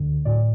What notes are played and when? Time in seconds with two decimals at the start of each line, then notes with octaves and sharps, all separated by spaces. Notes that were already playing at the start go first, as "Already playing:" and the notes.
Already playing: D2 D3
0.25 A2 F#3 D5